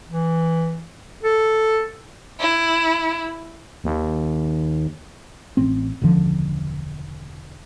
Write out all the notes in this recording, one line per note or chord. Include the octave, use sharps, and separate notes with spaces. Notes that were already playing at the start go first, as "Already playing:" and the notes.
E3
A4
E4
D#2
A1 C4
E1 C#2 D3 F3